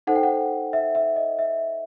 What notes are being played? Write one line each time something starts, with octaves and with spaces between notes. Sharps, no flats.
D#4 A4 C5 F#5
G5
F#5
E5
E5
D#5
E5